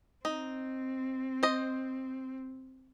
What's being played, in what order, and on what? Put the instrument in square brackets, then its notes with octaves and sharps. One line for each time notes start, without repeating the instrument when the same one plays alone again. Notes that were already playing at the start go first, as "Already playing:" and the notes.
[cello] C4 [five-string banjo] D#4
[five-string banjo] C5 D#5